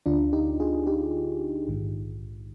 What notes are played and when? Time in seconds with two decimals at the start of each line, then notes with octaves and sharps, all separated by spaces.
0.06 D2 D3 D4 F4
0.33 D#4 G4
0.60 F4 G#4
0.87 D#4 G4
1.67 A#1 G#2 D#3